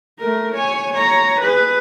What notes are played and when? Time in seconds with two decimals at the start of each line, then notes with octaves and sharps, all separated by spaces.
0.19 A3 A#4
0.55 C#5 G#5
0.94 C#5 A#5
1.41 G#4 B4